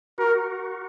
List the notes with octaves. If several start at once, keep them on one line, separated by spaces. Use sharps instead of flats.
F#4 A#4